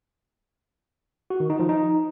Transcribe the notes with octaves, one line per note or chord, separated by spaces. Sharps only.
F#4
D#3
D#4
F3
D#4